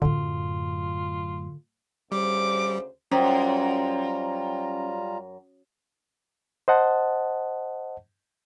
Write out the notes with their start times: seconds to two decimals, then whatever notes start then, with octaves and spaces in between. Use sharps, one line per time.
0.02 F#2 A2 D3 F4
2.12 D2 C#3 G3 C5 D6
3.11 F#2 G3 C#4 F4 C5 G5 A#5
6.68 C5 D#5 F#5 A5